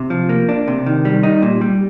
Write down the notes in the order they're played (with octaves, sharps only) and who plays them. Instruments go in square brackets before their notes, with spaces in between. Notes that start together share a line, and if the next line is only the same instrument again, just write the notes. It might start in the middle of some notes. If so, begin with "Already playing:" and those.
Already playing: [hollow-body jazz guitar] C3
F3
A#3
D4
C3
D#3
G3
D#4
A#2
G3